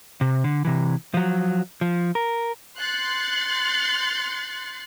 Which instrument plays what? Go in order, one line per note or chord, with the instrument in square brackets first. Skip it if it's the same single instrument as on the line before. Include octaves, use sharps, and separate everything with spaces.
[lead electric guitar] C3
D3
C3 E3
F3 F#3
F3
A#4
[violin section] C6 F#6 G6 A6 C7 C#7